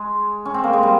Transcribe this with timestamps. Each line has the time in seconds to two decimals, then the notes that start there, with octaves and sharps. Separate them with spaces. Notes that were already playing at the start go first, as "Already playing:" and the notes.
Already playing: G#3
0.45 C#4
0.54 C4
0.64 A#3
0.73 G#3
0.83 G3